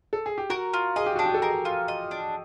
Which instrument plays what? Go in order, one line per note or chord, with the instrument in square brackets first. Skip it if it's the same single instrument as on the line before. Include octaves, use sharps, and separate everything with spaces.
[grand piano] A4
G#4
G4
[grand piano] F#4 [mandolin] A#4
[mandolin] F4
[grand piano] G#4 [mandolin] D#5
[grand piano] G4
[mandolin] D4 [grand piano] F#4
[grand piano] G4
A4
[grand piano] G#4 [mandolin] A#4
[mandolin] F4
D#5
D4